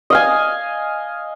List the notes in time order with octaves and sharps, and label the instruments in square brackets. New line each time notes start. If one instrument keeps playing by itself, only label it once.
[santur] D#5 F5 G#5